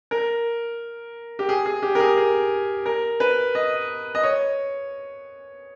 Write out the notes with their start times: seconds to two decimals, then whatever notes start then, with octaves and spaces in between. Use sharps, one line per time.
0.11 A#4
1.39 G4
1.49 G#4
1.66 G#4
1.83 G4
1.95 A#4
2.00 G#4
2.17 G#4
2.86 A#4
3.20 B4
3.55 D#5
4.15 D#5
4.23 C#5